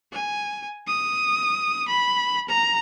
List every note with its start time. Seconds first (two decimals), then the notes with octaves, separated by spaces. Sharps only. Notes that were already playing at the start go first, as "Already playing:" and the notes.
0.13 G#5
0.87 D#6
1.88 B5
2.49 A#5